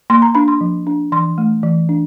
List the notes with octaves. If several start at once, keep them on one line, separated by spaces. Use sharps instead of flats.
A#3 C6
A#5
D4 B5
C6
F3
D4
E3 C6
A3
E3
D4